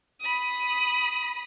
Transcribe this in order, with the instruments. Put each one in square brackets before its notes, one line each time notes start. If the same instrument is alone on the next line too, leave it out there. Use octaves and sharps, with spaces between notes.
[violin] B5 D#6